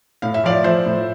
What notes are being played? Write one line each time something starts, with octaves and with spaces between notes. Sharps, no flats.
A2 F5
E5
F3 D5 F5
F3 C5 E5
A2